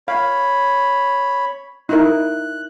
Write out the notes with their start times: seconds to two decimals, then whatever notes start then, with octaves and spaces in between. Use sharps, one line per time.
0.08 C#5 F5 B5
1.89 D#4 E4 A#4 F#6